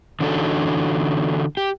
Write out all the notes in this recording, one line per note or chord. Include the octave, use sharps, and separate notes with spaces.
D3 E3 C#4 D#4 F#4 A4
G4